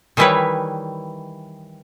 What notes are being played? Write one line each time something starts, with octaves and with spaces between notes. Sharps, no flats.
D#3 E3 G3 E4 B4 C#5